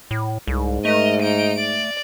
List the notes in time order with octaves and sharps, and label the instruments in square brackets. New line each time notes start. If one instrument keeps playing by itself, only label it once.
[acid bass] A2
[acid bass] C2 [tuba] G#2
[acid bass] A3 [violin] A#4 D#5
[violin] D#4 D7
D5